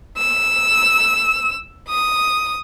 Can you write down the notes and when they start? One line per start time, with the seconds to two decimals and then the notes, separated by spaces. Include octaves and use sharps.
0.17 E6
1.89 D#6